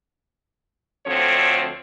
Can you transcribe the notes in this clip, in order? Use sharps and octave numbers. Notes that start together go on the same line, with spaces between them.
D2 D3 F3 C4 C#5